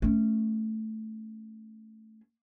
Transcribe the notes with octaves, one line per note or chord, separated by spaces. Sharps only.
A3 C#4